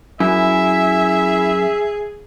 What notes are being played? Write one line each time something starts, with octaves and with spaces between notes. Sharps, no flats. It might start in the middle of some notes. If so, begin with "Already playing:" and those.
F#2 E4 G#4 E5